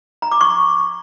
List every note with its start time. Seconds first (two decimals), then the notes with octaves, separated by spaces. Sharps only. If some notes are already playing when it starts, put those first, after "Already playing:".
0.22 A#5
0.32 D6
0.41 C#6